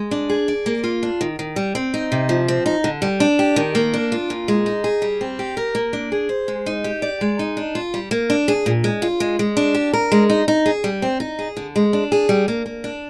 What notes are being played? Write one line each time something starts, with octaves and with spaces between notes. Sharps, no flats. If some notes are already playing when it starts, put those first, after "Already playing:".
Already playing: G#3
D4
G#4
D5
A#3
F4
D4
D#3
D#3
G3
C4
D#4
C3
F3
C4
D#4
D3
G3
D4
G4
D#3
A#3
D4
F4
A#2
G#3
D#4
G#4
G3
C4
G4
A#4
A#3
D4
G#4
C5
G#3
D#4
G4
D5
G#3
D#4
D4
F4
G3
A#3
D4
G#4
A#2
G#3
F4
G#3
G#3
D4
G4
A#4
G#3
D#4
D#4
G#4
G3
C4
D#4
G#4
D3
G#3
D4
G#4
G3
A#3
A#3
D4